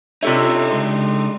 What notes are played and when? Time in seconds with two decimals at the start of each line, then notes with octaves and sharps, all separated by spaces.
0.23 C3 D4 D#4 F4 A4 C#5 E5
0.71 C#3 G#3 C6